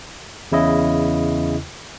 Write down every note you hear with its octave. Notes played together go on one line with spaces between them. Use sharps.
E2 C#3 E4 D#5